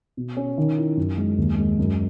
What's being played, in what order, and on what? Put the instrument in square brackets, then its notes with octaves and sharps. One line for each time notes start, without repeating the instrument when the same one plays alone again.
[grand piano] B2
C#4
D#3
E4
F#2
G#3
D#2
G#3
F#2